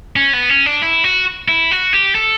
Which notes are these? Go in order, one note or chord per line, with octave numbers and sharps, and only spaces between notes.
C#4
B3
C#4
D4
E4
F#4
E4
F#4
G4
A4